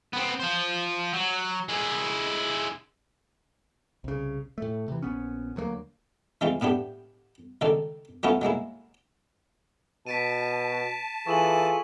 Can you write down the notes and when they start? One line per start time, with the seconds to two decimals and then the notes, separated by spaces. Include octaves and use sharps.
0.13 B3 C4
0.40 F3 C5
1.13 F#3
1.69 G#3 E4
4.04 C2 C#3
4.58 A2 A3
4.88 C3 E3
5.02 A#1 B3 C#4
5.56 D2 F#3 G#3 A#3
6.41 E3 G#3 C4 F4
6.61 A2 B3 D4 G4
7.61 C#2 D#3 A4 D5
8.23 F#3 A3 B3 C#4 E4 F4
8.41 F#3 G#3 A#3 E4
10.07 B2 A5 B6 D7 D#7
11.27 E3 F4 G#4 A4 C#6 E7 F#7